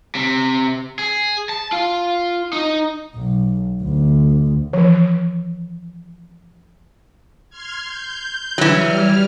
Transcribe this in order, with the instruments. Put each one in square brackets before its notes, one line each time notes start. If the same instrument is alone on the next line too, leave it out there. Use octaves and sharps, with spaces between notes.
[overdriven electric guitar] C3
G#4
A5
F4
D#4
[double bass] B1
D2
[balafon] E3 F3
[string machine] C6 F6 G#6
G6
[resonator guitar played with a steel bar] E3 F#3 [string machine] G3 F6